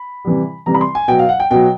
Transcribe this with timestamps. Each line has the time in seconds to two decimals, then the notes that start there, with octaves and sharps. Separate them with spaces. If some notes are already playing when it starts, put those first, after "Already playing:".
Already playing: B5
0.25 C3 E3 G3
0.66 C3 E3 G3 A#5
0.74 B5
0.81 C6
0.95 G#5
1.08 B2 F#3 G5
1.19 F5
1.29 F#5
1.40 G5
1.51 B2 F#3 G5